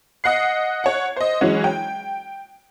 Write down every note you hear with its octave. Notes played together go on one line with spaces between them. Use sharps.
D#5 F#5 F#6 C7
C#5 F#5
C5 D#5
E3 F#3 G#3 C#4 F#4
G5